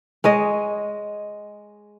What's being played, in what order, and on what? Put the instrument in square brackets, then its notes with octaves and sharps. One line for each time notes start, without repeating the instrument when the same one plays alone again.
[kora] G#3 C#5 D#5